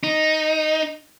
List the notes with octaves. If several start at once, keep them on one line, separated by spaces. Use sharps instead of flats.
D#4